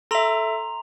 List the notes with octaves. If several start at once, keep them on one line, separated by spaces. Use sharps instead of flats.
A4 E5 A#5 C6 F7